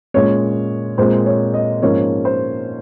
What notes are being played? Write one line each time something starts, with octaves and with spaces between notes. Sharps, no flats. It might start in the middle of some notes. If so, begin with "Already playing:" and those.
A#2 G#3 C#4 C#5
A#2 G#3 C4 C5
C#5
D#5
G#2 F3 A#3 C#4 C#5
C5